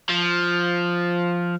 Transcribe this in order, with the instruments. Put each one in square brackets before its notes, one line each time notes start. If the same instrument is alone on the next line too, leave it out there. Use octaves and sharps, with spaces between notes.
[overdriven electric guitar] F3